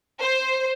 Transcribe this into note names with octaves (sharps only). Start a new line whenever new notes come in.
C5